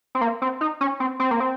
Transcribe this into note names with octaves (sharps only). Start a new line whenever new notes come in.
C4
A#3
C4
D#4
C#4
C4
C4
A#3
C4